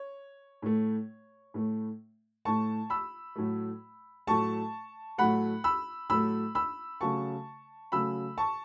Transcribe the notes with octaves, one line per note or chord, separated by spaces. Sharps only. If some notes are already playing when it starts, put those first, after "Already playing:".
Already playing: C#5
A2 A3
A2 A3
A2 A3 A5 C#6
B5 E6
A2 F#3 A3
A2 F#3 A3 A5 C#6
A2 F#3 A3 F#5 B5
B5 E6
A2 F#3 A3 B5 E6
B5 E6
C#3 F#3 A3 A5 C#6
C#3 F#3 A3 B5 E6
A5 C#6